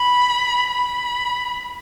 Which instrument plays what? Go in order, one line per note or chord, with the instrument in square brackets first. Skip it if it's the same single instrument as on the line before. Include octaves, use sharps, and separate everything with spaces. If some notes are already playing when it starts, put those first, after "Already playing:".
Already playing: [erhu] B5
B5